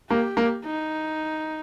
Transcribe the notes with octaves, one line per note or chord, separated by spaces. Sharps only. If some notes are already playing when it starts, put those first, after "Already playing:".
A#3 G4
A#3
D#4